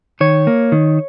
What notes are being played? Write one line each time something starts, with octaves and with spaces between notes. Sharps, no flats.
D#3 C#5
A#3
D#3